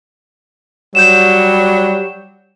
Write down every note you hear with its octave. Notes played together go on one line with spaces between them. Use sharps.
F#3 G3 G6 E7